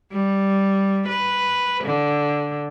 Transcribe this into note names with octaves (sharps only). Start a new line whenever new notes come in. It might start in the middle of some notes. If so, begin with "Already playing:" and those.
G3
B4
D3